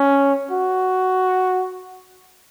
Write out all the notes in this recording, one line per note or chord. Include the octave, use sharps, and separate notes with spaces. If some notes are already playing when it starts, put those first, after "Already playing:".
Already playing: C#4
F#4